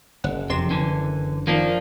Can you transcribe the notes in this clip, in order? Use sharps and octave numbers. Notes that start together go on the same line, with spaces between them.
F#1 F#5
F2 C3 C6 E7
D3 E3
D#3 F3 A#3 D4